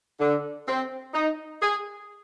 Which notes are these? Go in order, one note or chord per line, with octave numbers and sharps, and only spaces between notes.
D3
C4
D#4
G#4